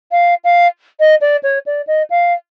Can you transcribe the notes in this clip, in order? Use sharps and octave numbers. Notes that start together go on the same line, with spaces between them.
F5
F5
D#5
D5
C#5
D5
D#5
F5